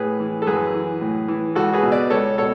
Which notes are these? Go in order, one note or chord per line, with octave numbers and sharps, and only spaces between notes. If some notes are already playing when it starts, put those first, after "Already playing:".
Already playing: A2 G#4 B4
E3
A4
F#2 G#4 B4
E3
A2
E3
C#2 F#4 A4
G#4 B4
B2
B4 D5
C#2 A4 C#5
B2 A4 C#5